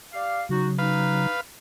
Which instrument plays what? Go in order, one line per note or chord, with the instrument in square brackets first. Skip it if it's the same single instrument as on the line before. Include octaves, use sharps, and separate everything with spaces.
[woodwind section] G4 D5 F5
[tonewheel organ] C#3 F#3 [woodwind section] D#4 F#4
[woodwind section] D#4 [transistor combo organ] B4 F5